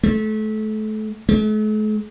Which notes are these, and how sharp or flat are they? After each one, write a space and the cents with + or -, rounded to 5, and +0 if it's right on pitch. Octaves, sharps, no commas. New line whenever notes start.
A3 -30
A3 -45